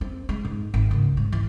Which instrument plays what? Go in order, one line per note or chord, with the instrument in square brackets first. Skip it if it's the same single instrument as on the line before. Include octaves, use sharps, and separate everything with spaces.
[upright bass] C4
G#3
G#2
G#1
C#2
G#2
E3